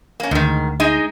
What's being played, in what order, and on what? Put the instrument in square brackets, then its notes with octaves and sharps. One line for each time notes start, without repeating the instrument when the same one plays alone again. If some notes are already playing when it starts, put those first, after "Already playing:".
[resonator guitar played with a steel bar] A#3 C#4
[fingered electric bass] D2 [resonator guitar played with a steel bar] G#2 D#3
[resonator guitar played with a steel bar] G#3 D#4